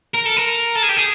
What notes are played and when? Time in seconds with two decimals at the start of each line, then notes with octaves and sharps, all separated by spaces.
0.14 A#4
0.25 A4
0.36 A#4
0.75 A4
0.83 G#4
0.89 G4
0.97 G#4